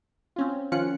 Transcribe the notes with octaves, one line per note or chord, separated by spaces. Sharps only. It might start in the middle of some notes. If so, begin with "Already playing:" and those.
C4 C#4 F4
D#3 F3 C#4 F4 F#6 C#7